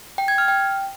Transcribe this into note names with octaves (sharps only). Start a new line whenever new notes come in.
G5
G#6
F6
G5